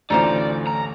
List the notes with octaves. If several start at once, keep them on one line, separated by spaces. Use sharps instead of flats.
A1 D2 A3 D#4 F4 C5 D5
A#5